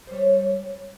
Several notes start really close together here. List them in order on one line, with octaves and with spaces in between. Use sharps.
C5 G3 C#5